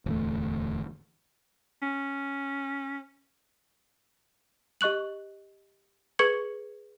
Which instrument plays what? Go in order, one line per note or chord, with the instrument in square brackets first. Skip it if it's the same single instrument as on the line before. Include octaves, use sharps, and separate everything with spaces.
[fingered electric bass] D1 E2 A3
[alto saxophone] C#4
[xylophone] G4 D#5 C#6 F#6 F#7
G#4 B4 C#6 G#6 C#7 F#7